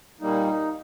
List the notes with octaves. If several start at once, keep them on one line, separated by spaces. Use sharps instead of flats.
A#2 G3 A#3 D#4